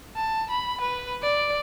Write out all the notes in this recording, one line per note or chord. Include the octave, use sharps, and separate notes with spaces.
A5
B5
B4
D5